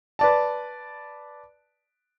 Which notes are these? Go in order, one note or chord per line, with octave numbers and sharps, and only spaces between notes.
B4 D5 A5